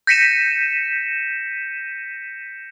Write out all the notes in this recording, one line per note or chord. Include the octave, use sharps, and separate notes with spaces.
G6 A#6 B6 C#7 D#7 E7